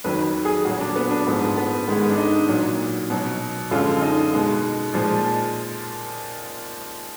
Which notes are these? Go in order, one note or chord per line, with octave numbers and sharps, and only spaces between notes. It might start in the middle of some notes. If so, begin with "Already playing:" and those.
F2 D#3 F#3 B4
G#4
A#2 F#3 F#4
D4
B3
D4
G#2 F3 G#3 B3
B3
G#2 D#3 G#3 B3
D4
D#4
A#2 F#3
B2 F#3
F#2 D3 F3 G#3 F4
D#4
B2 G#3
A#2 F3 G#3